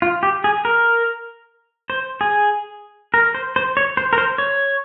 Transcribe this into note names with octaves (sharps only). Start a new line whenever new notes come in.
F4
G4
G#4
A#4
C5
G#4
A#4
C5
C5
C#5
C5
A#4
C5
C#5